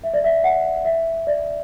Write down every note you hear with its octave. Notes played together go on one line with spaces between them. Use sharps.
E5
D5
E5
F#5
E5
D5